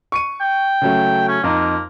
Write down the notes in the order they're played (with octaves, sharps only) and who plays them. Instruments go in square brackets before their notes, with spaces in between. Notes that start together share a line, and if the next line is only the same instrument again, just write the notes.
[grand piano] C#6 C#7 D#7
[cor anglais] G5
[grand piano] C#3 F#3 A3
[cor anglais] C#4
[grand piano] F2 D#4 [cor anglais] A#3